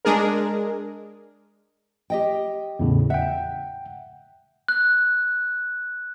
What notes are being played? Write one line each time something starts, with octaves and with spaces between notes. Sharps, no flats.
G#3 D4 G#4 A#4
G4 D#5 G5
E2 A2 C#3
E5 F#5 G5
F#6